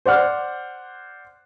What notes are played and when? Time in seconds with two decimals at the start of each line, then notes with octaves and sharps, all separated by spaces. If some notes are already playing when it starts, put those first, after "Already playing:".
0.06 C5 D5 F#5 F6